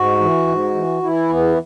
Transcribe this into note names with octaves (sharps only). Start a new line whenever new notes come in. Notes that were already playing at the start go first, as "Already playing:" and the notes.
Already playing: G#2 F#4
E3
G#2
E3
E3 E4
E2 B3